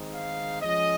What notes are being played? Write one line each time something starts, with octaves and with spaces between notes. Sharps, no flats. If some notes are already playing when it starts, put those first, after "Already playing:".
Already playing: D#3 G#3 C4 D#4
F5
F3 G#3 C#4 D#5